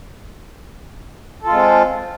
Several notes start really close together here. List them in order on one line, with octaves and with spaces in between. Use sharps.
A4 F4 G#3 C4